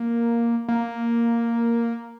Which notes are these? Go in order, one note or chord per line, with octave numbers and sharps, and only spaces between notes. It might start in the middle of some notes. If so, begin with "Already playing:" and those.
Already playing: A#3
A#3